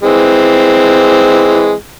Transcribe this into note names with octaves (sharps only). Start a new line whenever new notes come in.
E3 G#3 C4